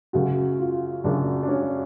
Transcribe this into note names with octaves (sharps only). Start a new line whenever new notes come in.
F#2 C#3 F#4
F4
F#2 C#3 D4
D4
C#4